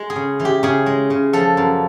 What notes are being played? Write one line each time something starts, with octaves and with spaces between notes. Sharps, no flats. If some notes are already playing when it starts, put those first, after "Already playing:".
Already playing: G#3
G#4
C#3
E3
G4
C#3 G#4
G#3
C#3
F3 A4
F#2